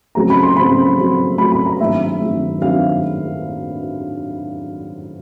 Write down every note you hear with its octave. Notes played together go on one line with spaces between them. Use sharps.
C#3 F#3 A3 C4 A#5
B5
C6
C#3 F#3 A3 C4 B5
C#3 F#3 A3 C4
C#3 F#3 A3 C4 B5
B5
A#5
G2 D#3 F#3 A3 C4 E5
G2 D#3 F#3 A3 C4
G2 D#3 F#3 A3 C4 F5